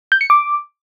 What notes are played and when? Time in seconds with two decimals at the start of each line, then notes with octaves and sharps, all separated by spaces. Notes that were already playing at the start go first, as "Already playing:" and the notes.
0.12 G6
0.21 C#7
0.30 D6